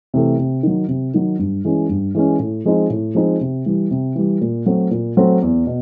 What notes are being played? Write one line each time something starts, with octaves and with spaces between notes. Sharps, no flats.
C3 E3 A3
C3
D#3 F#3
C3
D#3 F#3
G2
E3 G#3 C#4
G2
E3 G#3 C#4
A2
F3 G#3 C4 D#4
A2
F3 G#3 C4 D#4
C3
E3 G3
C3
E3 G3
A#2
F#3 A3 C4
A#2
F#3 A3 C4
E2
B2